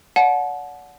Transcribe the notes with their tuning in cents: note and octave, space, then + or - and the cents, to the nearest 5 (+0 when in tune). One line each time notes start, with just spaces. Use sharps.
D5 -40 F#5 -20 A5 -35